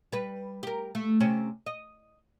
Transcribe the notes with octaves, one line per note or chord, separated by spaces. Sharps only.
G3 B4
G4 A#4
A3
C3 C4 C#4
D#5